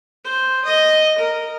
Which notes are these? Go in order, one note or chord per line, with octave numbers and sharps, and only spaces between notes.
C5
D#5
A#4